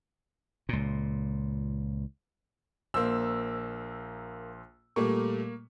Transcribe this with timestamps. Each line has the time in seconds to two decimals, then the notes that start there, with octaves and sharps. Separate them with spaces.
0.69 C#2 A#2
2.94 A#1 A#3 C5 E6
4.96 A#2 G3 A3 A#3 C#6